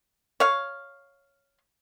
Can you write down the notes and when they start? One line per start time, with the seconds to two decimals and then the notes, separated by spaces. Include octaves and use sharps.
0.40 C#5 F5